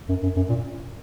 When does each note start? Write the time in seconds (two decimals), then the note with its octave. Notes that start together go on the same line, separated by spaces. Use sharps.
0.09 F#2
0.23 F#2
0.36 F#2
0.49 A#2